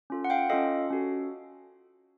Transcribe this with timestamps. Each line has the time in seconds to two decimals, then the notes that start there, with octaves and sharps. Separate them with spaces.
0.10 C#4 F4 A4
0.25 F#5
0.30 F5 G5
0.50 C#4 F4 A4 D#5 F5
0.90 C#4 F#4 A4